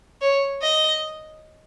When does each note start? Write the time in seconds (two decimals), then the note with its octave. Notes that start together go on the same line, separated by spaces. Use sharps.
0.22 C#5
0.62 D#5